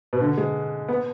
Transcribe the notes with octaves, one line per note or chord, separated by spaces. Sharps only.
B2
D3
G#3
B3